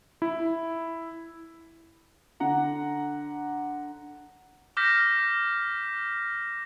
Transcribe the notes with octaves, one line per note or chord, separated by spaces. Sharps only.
E4
D3 F#5 A#5
D6 F6 G6 A#6 B6